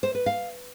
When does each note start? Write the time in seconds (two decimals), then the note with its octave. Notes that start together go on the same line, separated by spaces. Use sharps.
0.03 C5
0.15 B4
0.26 F5